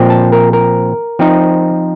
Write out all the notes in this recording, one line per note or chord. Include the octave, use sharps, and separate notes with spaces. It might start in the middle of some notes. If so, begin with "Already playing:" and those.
Already playing: A#2 F3 C4
A5
A#4
A#4
F3 C4 D#4